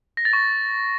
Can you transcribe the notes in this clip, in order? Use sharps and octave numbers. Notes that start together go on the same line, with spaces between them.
A#6
A6
C#6